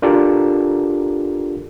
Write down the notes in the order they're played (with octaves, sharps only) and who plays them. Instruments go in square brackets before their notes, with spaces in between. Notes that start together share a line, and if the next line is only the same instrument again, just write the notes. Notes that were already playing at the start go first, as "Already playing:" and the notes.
[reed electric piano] D4 F4 G4 A4 A#4 D5